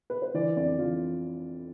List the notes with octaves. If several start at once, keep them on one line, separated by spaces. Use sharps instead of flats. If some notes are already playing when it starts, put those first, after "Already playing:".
B4
C5
E3 D5
F2 D5
E3 F4